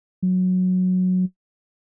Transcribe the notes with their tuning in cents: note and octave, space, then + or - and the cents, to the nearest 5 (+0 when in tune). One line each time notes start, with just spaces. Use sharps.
F#3 -10